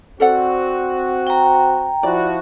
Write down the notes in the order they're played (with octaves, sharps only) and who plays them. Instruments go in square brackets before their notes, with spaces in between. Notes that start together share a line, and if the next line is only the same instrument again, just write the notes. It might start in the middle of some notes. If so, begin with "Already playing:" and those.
[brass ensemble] C4 F#4 [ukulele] A4 D5 F#5
[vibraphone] G5 A#5
[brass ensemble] F3 E4 F#4 [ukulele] D5